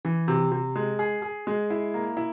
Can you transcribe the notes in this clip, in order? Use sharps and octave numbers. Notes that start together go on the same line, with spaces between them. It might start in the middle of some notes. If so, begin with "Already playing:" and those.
E3
C3
C3
G#3
G#4
G#4
G#3
E4
A#3
E4